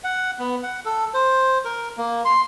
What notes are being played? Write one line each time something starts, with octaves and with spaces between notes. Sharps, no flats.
F#5
B3
F#5
A4
C5
A#4
A#3
C6